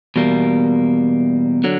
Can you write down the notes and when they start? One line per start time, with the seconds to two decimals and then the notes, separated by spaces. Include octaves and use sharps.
0.16 E2 B2 G3 A#3
1.64 D3 F#3